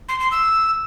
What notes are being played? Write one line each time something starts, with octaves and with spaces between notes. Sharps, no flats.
C6
C6
E6